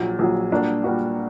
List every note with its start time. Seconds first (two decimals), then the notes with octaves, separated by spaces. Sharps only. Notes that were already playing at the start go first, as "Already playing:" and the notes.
Already playing: A#1 A#2 F#3
0.19 A#1 A#2 F#3
0.51 A#2 G3 A#3 D4 F#4
0.84 A#2 G3 A#3 D4 F#4